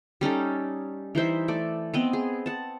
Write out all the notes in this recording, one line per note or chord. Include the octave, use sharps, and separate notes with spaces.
G3 C#4 D#4 A4
E3 D#4 C5 E5
A3 D5
B3 C4 D#5
G#4
F#5 A5